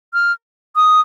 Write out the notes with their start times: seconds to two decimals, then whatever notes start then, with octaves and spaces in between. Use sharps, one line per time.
0.13 F6
0.76 D#6